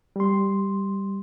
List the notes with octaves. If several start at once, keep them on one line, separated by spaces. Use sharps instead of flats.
G3 C6